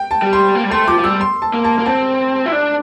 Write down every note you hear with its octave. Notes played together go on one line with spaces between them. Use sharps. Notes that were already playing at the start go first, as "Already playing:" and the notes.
Already playing: G5
A5
G3
C6
A#3
G3
A3 C6
F3 D6
F3
G3 E6
C6
A5
A#3
A5
A#3
C4 A5
E4
D4